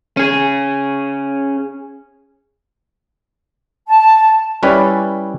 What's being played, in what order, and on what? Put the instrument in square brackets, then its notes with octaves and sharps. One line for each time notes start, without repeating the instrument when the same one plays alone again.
[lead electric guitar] C#4 G#4
[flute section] A5
[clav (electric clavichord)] G3 C#4 E4 B4 D5